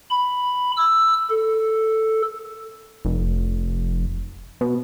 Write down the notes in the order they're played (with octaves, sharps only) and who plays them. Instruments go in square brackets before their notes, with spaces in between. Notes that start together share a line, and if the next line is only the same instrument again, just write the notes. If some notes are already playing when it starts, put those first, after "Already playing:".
[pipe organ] B5
E6
A4
[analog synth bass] F1
B2